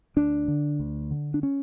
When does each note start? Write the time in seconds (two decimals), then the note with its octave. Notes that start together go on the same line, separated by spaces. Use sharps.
0.16 D2 D4
0.48 D3
0.80 D2
1.11 D3
1.34 D4
1.43 C#4